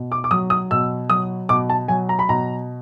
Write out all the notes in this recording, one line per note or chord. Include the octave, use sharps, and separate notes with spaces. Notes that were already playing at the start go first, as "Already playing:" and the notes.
Already playing: B2
D6
D6
F#3 D#6
D#6
B2 E6
F#3 D#6
B2 D6
A5
F#3 G#5
A#5
B5
B2 A#5